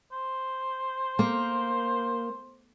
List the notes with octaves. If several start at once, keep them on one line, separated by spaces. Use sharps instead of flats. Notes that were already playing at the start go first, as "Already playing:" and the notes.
C5
A#3